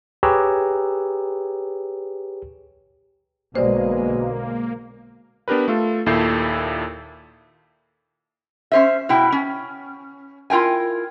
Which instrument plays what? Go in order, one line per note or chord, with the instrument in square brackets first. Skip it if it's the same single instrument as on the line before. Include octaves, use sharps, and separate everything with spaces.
[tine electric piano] G4 G#4 B4 C#5 A#5 E6
[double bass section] B1 D3 G#3 [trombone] B2 [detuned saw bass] A#3 [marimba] C5 D5
[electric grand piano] B3 D4 G4 A#4 B4
A3 F4 A4
D#2 A#2 E4 A4 G6 C7
[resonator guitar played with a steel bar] C#4 C5 E5
B2 E4 G5
C#4
E4 F4 A#4 G5 G#5